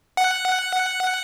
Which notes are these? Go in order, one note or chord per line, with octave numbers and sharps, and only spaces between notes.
F#5